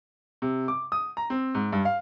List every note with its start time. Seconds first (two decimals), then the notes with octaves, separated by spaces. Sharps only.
0.42 C3
0.68 D6
0.92 D#6
1.17 A#5
1.30 C4
1.55 G#2
1.73 G2
1.85 F5